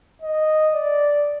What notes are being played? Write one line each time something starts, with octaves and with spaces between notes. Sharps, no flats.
D#5
D5